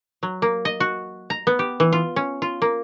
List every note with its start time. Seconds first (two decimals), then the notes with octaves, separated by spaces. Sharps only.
0.23 F#3
0.42 A#3
0.65 D#5
0.80 F#4
1.30 A#5
1.47 B3
1.59 G4
1.80 E3
1.93 F4
2.16 C#4
2.42 F4
2.62 A#3